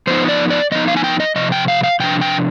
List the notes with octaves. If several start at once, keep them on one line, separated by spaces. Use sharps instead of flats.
F3 B3 D#4 C5
D5
D5
F3 B3 D#4 D#5
F5
G#5
G5
D#5
C3 F3 D#5
G5
F5
F5
C3 F3 D4 G5
G5